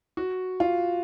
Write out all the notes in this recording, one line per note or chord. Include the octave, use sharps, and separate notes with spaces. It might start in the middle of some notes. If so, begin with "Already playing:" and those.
F#4
F4